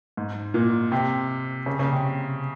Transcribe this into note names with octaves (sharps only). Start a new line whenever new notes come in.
G#2
A#2
C3
C#3
C#3
C3